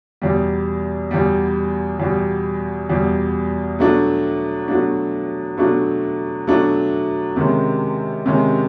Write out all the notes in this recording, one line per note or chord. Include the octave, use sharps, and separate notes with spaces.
E2 B2 G3
E2 B2 G3
E2 B2 G3
E2 B2 G3
B2 F#3 A3 D4
B2 F#3 A3 D4
B2 F#3 A3 D4
B2 F#3 A3 D4
C3 D#3 G#3 C#4
C3 D#3 G#3 C#4